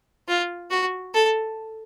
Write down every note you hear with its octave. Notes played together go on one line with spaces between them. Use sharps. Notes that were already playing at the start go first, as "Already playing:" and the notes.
F4
F#4
A4